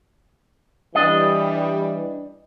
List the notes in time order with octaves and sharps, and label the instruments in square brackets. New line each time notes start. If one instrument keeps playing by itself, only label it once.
[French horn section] E3 G3 [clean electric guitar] D4 D#5